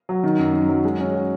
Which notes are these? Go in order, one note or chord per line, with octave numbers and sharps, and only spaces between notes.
F#3
D#3
F#2
D#3
F#3
G#3
C#4
F#4